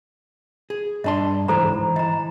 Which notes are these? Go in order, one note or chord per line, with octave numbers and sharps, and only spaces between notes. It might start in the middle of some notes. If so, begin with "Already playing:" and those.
G#4
G2 D4 D#5 A5 C6
C#2 G#2 E3 A4 C5 A#5
E3 D#5 A#5